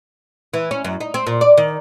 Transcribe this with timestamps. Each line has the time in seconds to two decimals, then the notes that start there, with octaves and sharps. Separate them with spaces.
0.54 E3
0.71 C#4
0.85 F#2
1.01 D#4
1.14 C4
1.27 A#2
1.41 D5
1.58 D#3